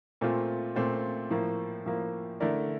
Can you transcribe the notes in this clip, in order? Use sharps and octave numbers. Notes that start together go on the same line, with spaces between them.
A#2 A3 C4 F4
A#2 A3 C4 F4
A2 F3 A#3
A2 F3 A#3
D3 A3 E4 A#4 D5